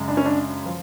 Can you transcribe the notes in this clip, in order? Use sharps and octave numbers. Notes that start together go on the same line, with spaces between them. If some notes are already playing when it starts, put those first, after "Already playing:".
Already playing: F#2 C#3 G#3
D4
C#4
D4
F3 F4